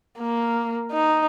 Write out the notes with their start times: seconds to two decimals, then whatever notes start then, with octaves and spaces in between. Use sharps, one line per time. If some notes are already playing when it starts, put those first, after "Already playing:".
0.19 A#3
0.92 D#4